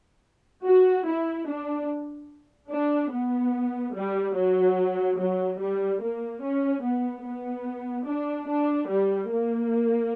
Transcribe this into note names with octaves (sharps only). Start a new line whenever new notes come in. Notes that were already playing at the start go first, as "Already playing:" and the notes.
F#4
E4
D4
D4
B3
G3
F#3
F#3
G3
A#3
C#4
B3
B3
D4
D4
G3
A#3